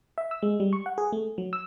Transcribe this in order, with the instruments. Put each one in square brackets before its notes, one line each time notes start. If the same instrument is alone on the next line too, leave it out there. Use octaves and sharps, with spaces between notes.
[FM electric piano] E5
E6
G#3
G3
C#6
F#5
G#4
A3
F#3
E6